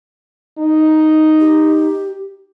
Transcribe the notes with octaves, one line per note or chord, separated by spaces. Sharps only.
D#4
G4